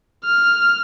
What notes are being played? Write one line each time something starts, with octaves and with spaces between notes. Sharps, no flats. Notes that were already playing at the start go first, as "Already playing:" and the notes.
F6